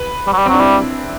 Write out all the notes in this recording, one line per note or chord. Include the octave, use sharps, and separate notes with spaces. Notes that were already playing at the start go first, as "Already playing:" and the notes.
Already playing: B4
G3
F#3
G3
C4
F#3 D4
G3 E4